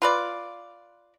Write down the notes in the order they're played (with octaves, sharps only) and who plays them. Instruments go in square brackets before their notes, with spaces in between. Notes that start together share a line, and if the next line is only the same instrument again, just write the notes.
[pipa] F4 B4 D5